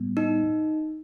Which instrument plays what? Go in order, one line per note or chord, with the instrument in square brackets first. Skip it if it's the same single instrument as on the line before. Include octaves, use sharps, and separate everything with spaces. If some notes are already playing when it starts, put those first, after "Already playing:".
Already playing: [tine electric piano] A2 G3 B3
[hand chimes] D#4